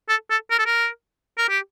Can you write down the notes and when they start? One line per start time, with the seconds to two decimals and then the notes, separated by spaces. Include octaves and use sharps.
0.09 A4
0.30 A4
0.51 A#4
0.59 A4
0.66 A#4
1.37 A#4
1.49 G4